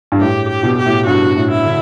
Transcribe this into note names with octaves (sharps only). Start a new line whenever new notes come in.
G2
A2 G4
G4
B2
G4
A2
G2 F#4
A2
E4
D3